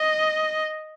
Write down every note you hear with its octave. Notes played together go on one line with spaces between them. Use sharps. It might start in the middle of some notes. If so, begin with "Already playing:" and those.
Already playing: D#5